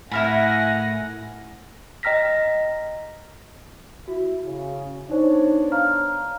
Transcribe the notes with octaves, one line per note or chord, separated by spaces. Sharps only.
A2 E4 A#4 F#5 G#5 B5 A#6
D#5 G5 A#5 F6 A#6 B6
E4 F#4
C#3
B3 D4 D#4 C5 C#5
F5 A#5 F6